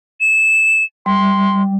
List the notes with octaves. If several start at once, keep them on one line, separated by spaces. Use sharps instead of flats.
E7
G3 C6